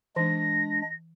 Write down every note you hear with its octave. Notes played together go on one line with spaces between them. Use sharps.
E3 G#3 D4 A#6